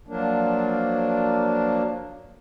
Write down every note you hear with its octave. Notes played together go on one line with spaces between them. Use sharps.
F3 F#3 A#3 D4